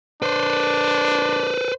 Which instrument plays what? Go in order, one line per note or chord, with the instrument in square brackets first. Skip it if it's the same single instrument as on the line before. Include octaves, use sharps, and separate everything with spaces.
[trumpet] D4 [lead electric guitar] B4 C5